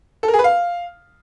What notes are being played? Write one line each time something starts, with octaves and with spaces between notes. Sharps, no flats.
A4
A#4
G#4
B4
F5